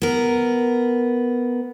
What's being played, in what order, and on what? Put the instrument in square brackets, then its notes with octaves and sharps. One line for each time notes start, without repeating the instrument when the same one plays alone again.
[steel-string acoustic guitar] B3 A#4